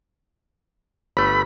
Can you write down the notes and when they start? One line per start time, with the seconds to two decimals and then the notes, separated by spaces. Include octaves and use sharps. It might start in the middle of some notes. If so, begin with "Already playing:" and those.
1.17 G1 A3 B5